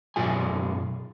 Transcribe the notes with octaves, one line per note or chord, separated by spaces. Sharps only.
F#2 B2 F4 G#4 G#5